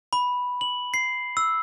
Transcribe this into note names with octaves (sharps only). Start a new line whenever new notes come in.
B5
F#7
C7
E6